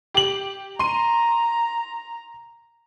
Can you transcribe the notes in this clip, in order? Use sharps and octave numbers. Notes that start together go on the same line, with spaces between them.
G4 F#7
A#5 C6 D#7